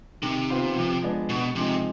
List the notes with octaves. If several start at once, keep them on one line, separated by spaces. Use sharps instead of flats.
C3 D#3
B3 F4 C5
F3
G#3 B3 D4
B2 D3
C3 F3 G#3 C4 D#4